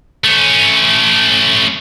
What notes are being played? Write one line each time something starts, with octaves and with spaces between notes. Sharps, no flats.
A3 C#4